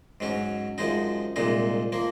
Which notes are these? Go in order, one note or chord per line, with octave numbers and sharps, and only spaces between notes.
G#2 F#3 C#4
F#2 F3 G#3 D#4
C2 A#2 G#3 D#4
F3 A#3